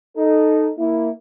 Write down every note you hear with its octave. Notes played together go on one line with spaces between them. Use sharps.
D#4 A4
A#3 E4